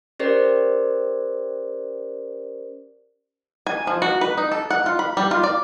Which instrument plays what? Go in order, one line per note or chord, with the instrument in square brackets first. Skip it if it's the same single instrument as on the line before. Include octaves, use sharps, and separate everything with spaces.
[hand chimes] C#4 G4 A#4 C5 D5
[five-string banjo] G#5
F3
F#4
B4
D#4
A4
F#5
F4
B5
G3
F4
D5